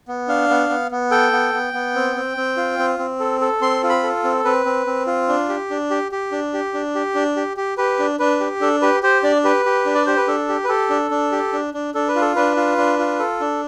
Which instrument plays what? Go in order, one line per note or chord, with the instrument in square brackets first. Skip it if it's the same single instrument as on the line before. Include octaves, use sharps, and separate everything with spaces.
[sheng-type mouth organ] B3
D4 F5
B3
B3
B3
A4 G5
B3
B3
B3
C4
C4
C4
F4
C4
C4
A4
A4
C4 C6
F4
B5
A4
C4
C4 B4
C4
C4
F4
D4
G4
D4
G4
G4
D4
G4
D4
G4
D4
G4
G4
G4 B4
D4
D4 B4
G4
D4 A4
G4 B4
G4 C5
D4 D5
G4 B4
G4
D4
D5
G4 C5
B4
D4 A4
G4
B4
G4 A4
D4
D4
G4
D4
D4
D4 A4
B4
F4
A4
D4 B4
F4
D4
F4
A4
D4